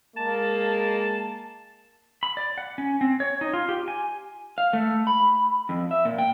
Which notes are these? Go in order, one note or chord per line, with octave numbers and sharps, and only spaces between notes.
G#3 A#3 A5
B5
D5
F#5
C#4
C4
C#5
D#4
F4
G4
G#5
F5
A3
B5
F2
E5
A#2
G5